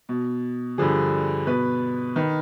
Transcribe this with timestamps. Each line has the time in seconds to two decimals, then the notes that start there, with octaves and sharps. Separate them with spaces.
0.09 B2
0.78 G2 D3 F3 G#4
1.47 B2 B4
2.16 D#3 B4